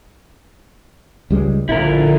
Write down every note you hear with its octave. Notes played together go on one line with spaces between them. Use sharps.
C#2 G3 G#3
A#1 D3 E4 F4 A#4